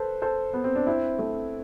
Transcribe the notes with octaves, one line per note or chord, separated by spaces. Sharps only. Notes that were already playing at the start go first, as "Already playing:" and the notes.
Already playing: A4 B4 C5
A4 C5
B3
C4
D4
C4 E4
A3 C4